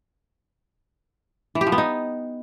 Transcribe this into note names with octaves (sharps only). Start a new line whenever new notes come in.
E3
G4
F3
B3
D#4